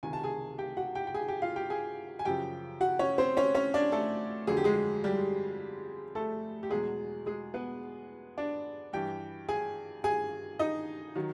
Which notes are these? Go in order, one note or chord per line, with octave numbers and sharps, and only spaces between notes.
C#2 C3 D#3 G#5
A5
G#4 G#5
G4 G5
F#4 F#5
G4 G5
G5
G#4 G#5
G4 G5
F4 F5
G4 G5
G#4 G#5
G#5
F#2 C#3 F3 G4 G5
F#4 F#5
C#4 C#5
C4 C5
C#4 C#5
C#4 C#5
D4 D5
A3 A4
F2 D3 F#3 G#4
G4
G#3 G#4
G3 G4
A3 A4
G4
E2 B2 F#3 G#3 G#4
G#3 G#4
B3 B4
D4 D5
G2 E3 G4 G5
G#4 G#5
G#4 G#5
D#4 D#5
D#3 F#3